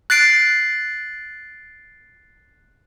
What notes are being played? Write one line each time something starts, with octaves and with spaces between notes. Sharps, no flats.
F#6 A6 C7 D7